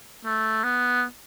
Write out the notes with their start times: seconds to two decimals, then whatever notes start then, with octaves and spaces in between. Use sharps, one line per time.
0.25 A3
0.64 B3